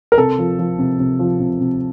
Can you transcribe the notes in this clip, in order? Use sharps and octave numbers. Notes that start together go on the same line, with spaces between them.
A#4
C3 A4
F3
F3
C3
C3
F3
C3
C3